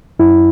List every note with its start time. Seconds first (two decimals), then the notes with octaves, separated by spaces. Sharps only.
0.19 F#2 E4